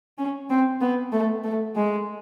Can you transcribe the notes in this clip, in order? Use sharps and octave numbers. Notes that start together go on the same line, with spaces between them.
C#4
C4
B3
A3
A3
G#3